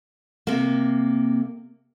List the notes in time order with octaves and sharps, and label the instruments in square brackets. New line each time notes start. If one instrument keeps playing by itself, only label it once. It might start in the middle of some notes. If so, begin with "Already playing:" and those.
[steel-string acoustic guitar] C3 A#3